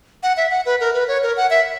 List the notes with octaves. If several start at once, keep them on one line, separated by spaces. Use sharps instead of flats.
F#5
E5
F#5
B4
A#4
B4
C#5
A#4
F#5
E5